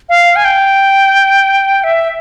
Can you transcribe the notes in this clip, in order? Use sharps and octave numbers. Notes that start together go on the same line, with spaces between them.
F5
G#5
G5
E5